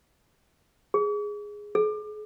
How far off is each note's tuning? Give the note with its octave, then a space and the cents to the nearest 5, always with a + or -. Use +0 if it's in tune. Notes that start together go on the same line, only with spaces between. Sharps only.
G#4 -5
G#4 +40